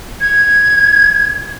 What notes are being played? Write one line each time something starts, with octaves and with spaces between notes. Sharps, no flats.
G#6